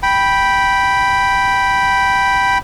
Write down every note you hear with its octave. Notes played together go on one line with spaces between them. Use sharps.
G5 B5